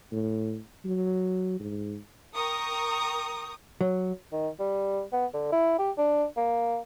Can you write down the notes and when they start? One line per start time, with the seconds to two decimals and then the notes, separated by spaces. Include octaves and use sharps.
0.12 A2
0.85 F#3
1.60 G#2
2.34 A#4 G5 A#5 C#6 D#6
3.81 F#3
4.32 D#3
4.59 G3
5.12 B3
5.34 D3
5.52 E4
5.79 G4
5.98 D4
6.37 A#3